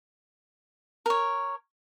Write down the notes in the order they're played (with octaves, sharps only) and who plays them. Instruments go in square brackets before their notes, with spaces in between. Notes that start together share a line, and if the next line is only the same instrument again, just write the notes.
[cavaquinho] A#4 C#5